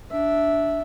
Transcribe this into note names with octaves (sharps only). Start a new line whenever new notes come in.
D4 E5